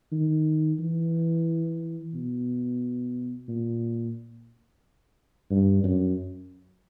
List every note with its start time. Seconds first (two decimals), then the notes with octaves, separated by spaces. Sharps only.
0.12 D#3
0.79 E3
2.14 B2
3.48 A#2
5.50 G2
5.84 F#2